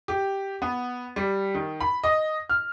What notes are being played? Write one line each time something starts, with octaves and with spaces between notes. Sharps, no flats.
G4
B3
G3
D#3
B5
D#5
F6